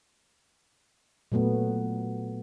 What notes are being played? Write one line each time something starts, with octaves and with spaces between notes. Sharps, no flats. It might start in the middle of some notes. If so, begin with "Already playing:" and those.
A#2 F#3 A3 B3